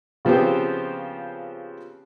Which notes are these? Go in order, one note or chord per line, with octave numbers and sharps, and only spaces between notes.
C#3 F3 B3 C4 G4